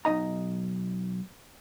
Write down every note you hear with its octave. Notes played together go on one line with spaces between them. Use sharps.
B1 B2 D#4 D#5 A#5